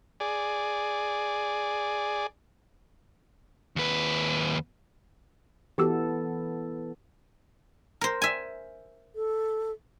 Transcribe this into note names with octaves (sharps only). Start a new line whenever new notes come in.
G#4 D5
D#2 B4
E3 B3 F#4 G4 A4 E6
A#4 C5
E5 G#5
A4